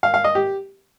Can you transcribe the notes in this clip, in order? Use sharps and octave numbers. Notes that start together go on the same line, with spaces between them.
F5
F5
D#5
G4